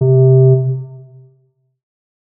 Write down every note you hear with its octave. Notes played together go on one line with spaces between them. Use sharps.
C3